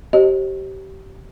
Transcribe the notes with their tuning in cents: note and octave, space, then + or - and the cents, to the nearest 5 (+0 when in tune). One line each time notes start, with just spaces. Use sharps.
G4 -30 C5 +40 D#5 -5